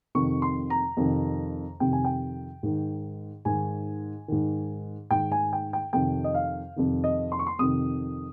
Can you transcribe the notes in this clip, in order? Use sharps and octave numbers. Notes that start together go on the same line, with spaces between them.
F2 C3 D#3 C#6
C6
A#5
F2 C3 D#3
F2 C3 D#3 G5
G#5
G5
G#2 D#3
G#2 D#3 G#5
G#2 D#3
G#2 D#3 G5
G#5
G5
G5
F2 C3 D#3 G5
D#5
F5
F2 C3 D#3
D#5
C6
C#6
C6
F2 C3 D#3 D#6